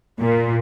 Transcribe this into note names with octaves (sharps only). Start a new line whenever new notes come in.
A#2